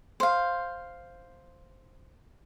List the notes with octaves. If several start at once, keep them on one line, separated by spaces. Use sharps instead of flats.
C5 F5